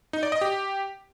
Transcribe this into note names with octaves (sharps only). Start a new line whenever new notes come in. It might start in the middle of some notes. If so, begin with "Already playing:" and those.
D#4
D5
D#5
G4